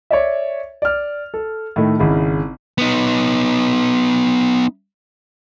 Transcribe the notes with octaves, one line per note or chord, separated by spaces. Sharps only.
C#5 D5 E5
D5 F6
A4
A2 D#3 A3
G#1 C#3 E4
B3 D#4